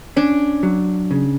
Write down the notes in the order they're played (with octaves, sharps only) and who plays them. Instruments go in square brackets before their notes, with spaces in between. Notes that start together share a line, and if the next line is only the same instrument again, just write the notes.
[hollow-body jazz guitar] C#4 [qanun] D4
[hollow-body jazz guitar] F#3
C#3